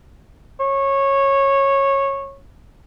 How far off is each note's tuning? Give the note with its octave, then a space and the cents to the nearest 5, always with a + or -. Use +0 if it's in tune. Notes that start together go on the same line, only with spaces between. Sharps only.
C#5 -15